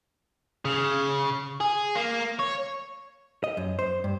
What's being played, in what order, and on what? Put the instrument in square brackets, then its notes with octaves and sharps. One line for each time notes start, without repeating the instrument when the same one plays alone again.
[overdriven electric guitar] C#3
G#4
A#3
C#5
[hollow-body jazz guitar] D#5
F#2
C5
G2